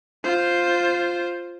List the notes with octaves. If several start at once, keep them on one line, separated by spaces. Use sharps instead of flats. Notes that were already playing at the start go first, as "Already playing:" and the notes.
F4 C5